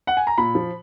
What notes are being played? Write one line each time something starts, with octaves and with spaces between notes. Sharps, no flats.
F#5
G#5
A#5
A#2 B5
F3